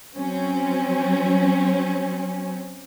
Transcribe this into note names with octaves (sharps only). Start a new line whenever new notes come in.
F#3 C4 C#4